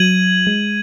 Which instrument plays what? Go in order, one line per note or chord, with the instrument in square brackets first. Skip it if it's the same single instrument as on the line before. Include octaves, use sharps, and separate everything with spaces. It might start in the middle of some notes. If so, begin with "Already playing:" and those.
Already playing: [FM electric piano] F#3 [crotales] G#6 D#7 F#7
[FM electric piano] G#3